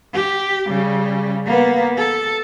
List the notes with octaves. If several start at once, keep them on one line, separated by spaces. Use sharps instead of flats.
G4
C#3 G3
A#3 B3
A4